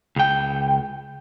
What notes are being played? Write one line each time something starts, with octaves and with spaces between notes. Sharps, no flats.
C#2 G5